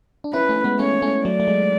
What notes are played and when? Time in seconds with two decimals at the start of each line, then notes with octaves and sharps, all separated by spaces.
0.24 D4
0.33 C#4 E4 B4
0.49 A3 C#4
0.64 G#3 B3
0.79 A3 C#4 C#5
1.02 A3 C#4
1.25 F#3 A3 D5
1.40 A3
1.48 G#3